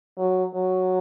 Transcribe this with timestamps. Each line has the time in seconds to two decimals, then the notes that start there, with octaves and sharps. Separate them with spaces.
0.18 F#3
0.54 F#3